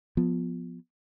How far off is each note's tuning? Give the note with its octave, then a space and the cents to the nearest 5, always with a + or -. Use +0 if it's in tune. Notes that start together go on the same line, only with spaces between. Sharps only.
F3 +15 B3 +0